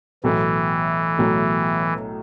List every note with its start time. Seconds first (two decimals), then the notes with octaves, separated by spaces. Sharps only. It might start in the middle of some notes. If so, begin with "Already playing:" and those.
0.24 B1 A2 E3 F#3 A3
1.19 B1 A2 F#3 A3